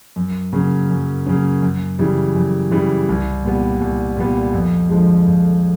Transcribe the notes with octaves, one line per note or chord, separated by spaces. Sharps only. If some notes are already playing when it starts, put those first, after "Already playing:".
F#2
C#3 F#3 A#3 C#4
F#2
C#3 F#3 A#3 C#4
F#2
C#3 E3 G3
F#2
C#3 E3 G3
C2
A#2 G3 B3
C2
A#2 G3 B3
F2
D3 F3 G#3
F2